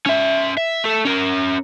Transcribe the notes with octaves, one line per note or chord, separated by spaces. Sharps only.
C#4 E5
E5
A3 A4
C#4 A#4